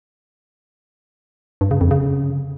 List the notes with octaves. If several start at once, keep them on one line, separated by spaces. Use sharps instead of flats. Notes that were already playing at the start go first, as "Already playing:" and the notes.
G2
C#3
F2
C#3